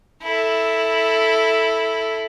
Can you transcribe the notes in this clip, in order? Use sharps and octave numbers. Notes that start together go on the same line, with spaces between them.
E4 A4